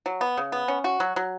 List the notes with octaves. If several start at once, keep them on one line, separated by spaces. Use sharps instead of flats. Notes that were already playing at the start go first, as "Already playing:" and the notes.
F#3
B3
C#3
B3
C#4
F#4
F#3
F#3